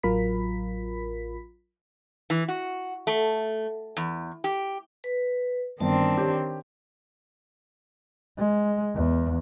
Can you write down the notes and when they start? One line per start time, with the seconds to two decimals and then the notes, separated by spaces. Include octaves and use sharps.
0.03 A1 F#3 F4 A#4 B5 B6
2.30 E3
2.48 F#4
3.07 A3
3.97 E2
4.44 G4
5.04 B4
5.80 G1 D#3 C4 D4 A5
6.18 G4 C#5
8.38 G#3
8.95 E2